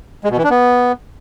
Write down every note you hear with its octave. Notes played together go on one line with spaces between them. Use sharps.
G#3
B2
E3
D4
B3